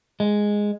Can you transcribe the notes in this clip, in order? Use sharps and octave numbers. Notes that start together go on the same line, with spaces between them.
G#3